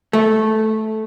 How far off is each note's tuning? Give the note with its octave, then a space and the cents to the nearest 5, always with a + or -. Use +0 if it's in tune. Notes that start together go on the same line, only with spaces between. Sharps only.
A3 -10